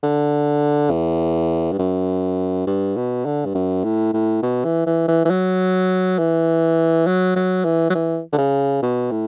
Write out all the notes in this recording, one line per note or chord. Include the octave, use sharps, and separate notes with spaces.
D3
E2
G2
F#2
G2
B2
D3
G2
F#2
A2
A2
B2
E3
E3
E3
E3
F#3
E3
F#3
F#3
E3
F#3
E3
D3
C#3
B2
A2